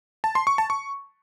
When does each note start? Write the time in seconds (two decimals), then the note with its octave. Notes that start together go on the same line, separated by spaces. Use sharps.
0.24 A5
0.35 C6
0.47 C#6
0.58 A5
0.70 C#6